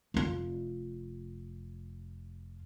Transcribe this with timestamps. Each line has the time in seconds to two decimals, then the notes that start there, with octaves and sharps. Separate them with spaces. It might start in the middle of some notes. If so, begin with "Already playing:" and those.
0.14 F1 F4